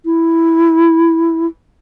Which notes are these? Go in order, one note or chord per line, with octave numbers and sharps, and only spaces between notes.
E4